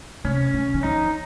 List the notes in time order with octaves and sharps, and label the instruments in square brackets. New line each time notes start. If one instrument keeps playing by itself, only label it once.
[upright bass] C3 [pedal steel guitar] C#4
[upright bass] C#3
D#3
[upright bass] F3 [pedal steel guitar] D#4